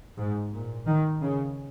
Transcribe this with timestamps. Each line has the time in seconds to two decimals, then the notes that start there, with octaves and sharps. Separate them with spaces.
0.17 G#2
0.53 A#2
0.87 D#3
1.22 C#3